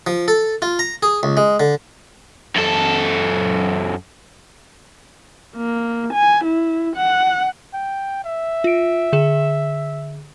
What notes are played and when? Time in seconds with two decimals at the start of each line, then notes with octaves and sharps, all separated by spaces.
0.07 F3
0.28 A4
0.62 F4
0.79 A#5
1.03 G#4
1.23 C#2
1.37 G#3
1.60 D3
2.56 F#2 A4
5.56 A#3
6.13 G#5
6.44 E4
6.96 F#5
7.74 G5
8.24 E5
8.64 F4 D7
9.13 D3 G#4 E7